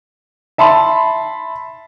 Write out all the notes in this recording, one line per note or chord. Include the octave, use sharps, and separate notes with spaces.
E5 A5 B5 C6